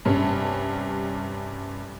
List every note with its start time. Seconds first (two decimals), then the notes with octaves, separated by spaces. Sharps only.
0.05 G2 C3 C#4